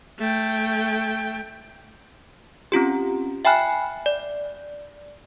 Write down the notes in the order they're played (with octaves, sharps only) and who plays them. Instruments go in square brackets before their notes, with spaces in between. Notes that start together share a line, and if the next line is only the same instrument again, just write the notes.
[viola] A3 G5
[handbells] C4 C#4 F4 G4
E5 G5 G#5 B5 F6 F#6
D5